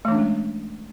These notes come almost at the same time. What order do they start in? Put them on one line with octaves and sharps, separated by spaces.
A3 E3 D4 C#4 G#3